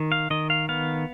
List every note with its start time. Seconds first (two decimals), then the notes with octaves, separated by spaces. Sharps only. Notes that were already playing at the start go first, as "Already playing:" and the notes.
Already playing: D#3
0.12 F5
0.30 D#3 D#5
0.50 F5
0.69 B3 F5